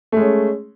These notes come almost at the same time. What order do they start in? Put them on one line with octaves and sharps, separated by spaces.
A3 G#3 C#4